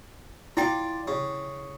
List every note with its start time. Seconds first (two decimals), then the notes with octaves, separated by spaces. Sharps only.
0.57 E4 F4 D5 G5 D6
1.07 C#3